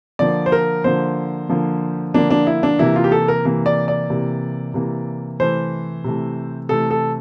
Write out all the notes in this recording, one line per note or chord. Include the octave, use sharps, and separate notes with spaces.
D3 F3 A#3 D5
C5
A#4
D3 F3 A#3 C5
D3 F3 A#3
D3 F3 A#3 D4
D4
E4
D4
C3 E3 A#3 E4
F4
G4
A4
A#4
C3 E3 A#3
D5
D5
C3 E3 A#3
C3 E3 A#3
C3 E3 A3 C5
C3 E3 A3
C3 E3 A3 A4
A4